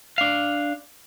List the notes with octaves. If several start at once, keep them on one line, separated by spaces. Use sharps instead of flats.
D4 F5